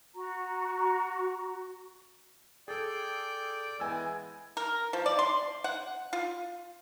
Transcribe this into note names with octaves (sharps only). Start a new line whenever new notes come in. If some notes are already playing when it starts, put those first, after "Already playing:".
F#4 A#5
G#4 A4 D5 G5
E3 G#3 B3 G#5 E6
A#4
F3
D5
C6
F#5
F4